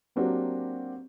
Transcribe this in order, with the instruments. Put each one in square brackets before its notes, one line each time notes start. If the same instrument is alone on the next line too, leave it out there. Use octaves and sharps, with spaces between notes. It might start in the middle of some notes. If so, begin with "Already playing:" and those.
[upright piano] F#3 A#3 C4 D4 F#4 G4